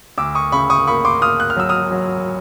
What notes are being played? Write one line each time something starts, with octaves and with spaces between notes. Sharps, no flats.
D2 D6 E6
C#6 D#6
C#3 B5 C#6
C#6 D#6
A#3 B5 C#6
C6 D6
A#3 D#6 F6
F#6
F6
F#3 E6
D#6 F6
F#3